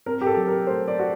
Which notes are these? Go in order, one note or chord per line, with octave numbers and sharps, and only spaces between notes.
C4 A#4
G4
A4
F#3
A#4
A3 C5
D5
F#4